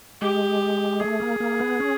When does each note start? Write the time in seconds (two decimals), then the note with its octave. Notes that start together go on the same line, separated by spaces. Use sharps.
0.21 G#3 G4
1.00 A3 G#4
1.20 A#3
1.40 A#3
1.60 B3
1.80 C#4